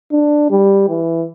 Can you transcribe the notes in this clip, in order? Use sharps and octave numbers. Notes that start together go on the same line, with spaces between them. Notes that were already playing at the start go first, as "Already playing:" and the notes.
D4
G3
E3